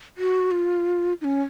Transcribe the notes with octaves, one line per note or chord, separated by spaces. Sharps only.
F#4
F4
D#4
C#4